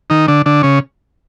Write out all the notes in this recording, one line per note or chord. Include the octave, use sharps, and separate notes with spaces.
D#3 D#4
D3 D4
D3 D4
C#3 C#4